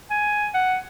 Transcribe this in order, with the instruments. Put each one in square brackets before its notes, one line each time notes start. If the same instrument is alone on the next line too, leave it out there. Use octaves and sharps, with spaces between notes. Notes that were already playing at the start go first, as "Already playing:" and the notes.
[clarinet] G#5
F#5